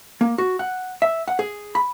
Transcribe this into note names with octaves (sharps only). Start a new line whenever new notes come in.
A#3
F#4
F#5
E5
F#5
G#4
B5